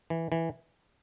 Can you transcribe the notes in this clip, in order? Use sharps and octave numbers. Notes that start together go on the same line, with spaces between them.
E3
E3